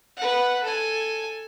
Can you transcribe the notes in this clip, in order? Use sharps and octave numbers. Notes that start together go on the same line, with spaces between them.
B4 F#5
A4 G#5